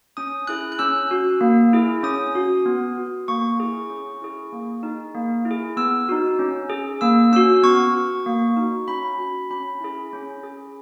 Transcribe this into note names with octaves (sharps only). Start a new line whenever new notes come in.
C#4 D#6
E4 G#4 F#6
F#6
C#4 E6
F#4
A#3
E4 G#4
C#4 D#6
F#4
B3
F#4
A#3 C#6
E4 G#4
C#4
E4 G#4
A#3
D#4 G#4
A#3
E4
G#4
B3 E6
D#4 F#4
C#4
G#4
A#3 E6
C#4 F#4 E6
B3 C#6
F#4
A#3
D#4 F#4
C#4 B5
F#4
C#4 B5
E4 G#4
C#4
G#4